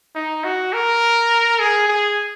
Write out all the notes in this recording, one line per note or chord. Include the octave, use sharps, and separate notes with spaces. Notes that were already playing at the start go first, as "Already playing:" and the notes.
D#4
F#4
A#4
G#4
G#4